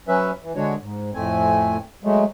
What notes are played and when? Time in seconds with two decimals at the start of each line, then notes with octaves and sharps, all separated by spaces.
0.08 F#3 C#4 B4 E5
0.42 E3
0.56 D3 G#3 D4 F#4 C#5
0.81 G#2
1.14 F2 A2 A3 C4 G#5
2.04 F#3 G#3 A3